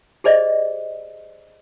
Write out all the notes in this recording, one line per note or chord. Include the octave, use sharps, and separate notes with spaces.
G4 G#4 C5 D5 D#5